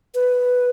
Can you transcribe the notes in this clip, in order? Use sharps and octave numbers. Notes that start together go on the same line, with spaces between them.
B4